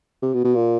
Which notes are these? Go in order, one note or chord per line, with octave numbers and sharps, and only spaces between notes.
C3
B2
B2
A#2